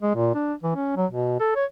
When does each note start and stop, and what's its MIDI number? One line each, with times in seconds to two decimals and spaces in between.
0.02 0.14 56
0.15 0.34 46
0.35 0.54 62
0.63 0.74 52
0.76 0.94 61
0.96 1.06 54
1.11 1.36 47
1.40 1.54 69
1.55 1.65 73